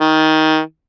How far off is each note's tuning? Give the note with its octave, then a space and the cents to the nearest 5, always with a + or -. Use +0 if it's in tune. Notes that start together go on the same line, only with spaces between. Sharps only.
D#3 +15